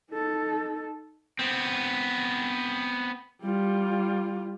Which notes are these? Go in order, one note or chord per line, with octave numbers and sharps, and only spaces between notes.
D#4 A4
B3 C4
G3 F4